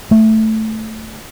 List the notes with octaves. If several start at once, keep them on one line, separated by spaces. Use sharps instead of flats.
A3